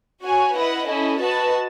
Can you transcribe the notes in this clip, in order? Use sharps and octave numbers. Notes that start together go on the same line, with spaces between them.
F#4 C#5 G#5
E4 B4 D#5 F#5
C#4 E4 A4 D#5
F#4 B4 D#5 A5